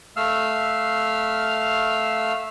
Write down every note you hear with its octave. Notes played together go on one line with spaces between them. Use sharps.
A3 F5 E6 F6